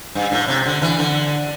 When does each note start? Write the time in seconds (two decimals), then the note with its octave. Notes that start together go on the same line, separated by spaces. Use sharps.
0.15 G2
0.32 A2
0.48 C3
0.66 D3
0.82 E3
0.99 D3